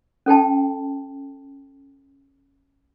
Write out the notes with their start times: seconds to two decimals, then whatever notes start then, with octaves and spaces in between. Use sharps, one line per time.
0.26 C#4 A4 G5 A5